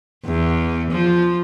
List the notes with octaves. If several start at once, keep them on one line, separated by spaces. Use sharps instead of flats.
E2
F3